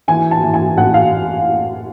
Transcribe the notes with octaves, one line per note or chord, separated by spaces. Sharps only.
E3 G#5
A5
E3
G#5
A1 F#5
F5